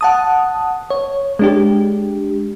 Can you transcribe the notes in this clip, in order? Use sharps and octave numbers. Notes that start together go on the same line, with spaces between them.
F#5 A5 D#6
C#5
G#3 D4 G4